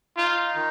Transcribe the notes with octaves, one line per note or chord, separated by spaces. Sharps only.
D#4 F4
D#3